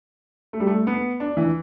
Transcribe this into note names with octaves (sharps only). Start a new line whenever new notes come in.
A3
G3
A3
B3
D4
E3